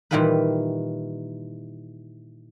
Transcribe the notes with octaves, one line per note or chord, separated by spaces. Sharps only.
A#2 D#3 E3 G3 A#3 B4